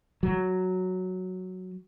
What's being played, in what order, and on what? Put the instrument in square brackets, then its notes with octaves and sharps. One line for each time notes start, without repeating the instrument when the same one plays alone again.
[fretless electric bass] F#3